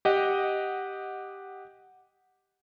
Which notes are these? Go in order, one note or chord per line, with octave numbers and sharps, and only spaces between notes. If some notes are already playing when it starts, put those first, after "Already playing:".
G4 D#5 F#5